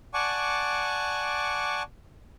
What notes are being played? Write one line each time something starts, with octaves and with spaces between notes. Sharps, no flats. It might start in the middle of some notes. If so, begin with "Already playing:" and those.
D5 F#5 G#5 A5 C#6 D6